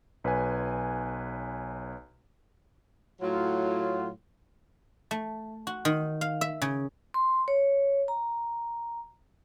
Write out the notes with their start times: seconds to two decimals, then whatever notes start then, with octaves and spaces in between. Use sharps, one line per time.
0.24 B1 B4 C#5 G#5
3.22 A2 F#3 F4
5.11 A3
5.67 F#4
5.85 D#3
6.21 F5
6.41 E5
6.62 C#3
7.14 C6
7.48 C#5
8.08 A#5